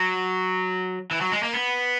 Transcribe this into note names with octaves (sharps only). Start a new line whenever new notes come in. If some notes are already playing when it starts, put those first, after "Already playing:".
Already playing: F#3
E3
F#3
G#3
A#3
B3